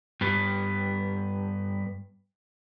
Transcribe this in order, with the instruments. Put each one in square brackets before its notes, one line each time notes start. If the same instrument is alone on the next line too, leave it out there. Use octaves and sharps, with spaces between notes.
[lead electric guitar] G2 B3